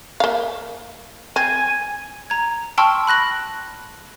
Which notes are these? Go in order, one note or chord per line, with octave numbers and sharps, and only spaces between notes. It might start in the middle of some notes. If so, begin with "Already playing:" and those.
A#3 F5
C4 G#5
A#5 G#6
G5 A5 C6 C#6 E6 F6
B5 F#6 A#6 F#7